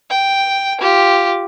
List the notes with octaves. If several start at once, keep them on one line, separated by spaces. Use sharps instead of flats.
G5
F4 G4